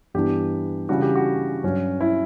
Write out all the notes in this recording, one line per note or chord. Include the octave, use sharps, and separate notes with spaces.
G2 E3 B3 D4 G4
C#3 E3 G3 D4 F#4
G4
F#4
G2 F#3 C#4
E4